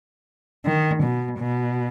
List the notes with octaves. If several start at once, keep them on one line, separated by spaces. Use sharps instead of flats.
D#3
B2
B2